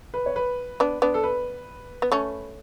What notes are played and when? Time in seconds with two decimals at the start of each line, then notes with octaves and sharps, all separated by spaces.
0.14 B4
0.26 C#5
0.36 B4
0.80 B3 D4
1.02 B3 D4
1.14 A4
1.23 B4
2.02 B3
2.12 A3 C#4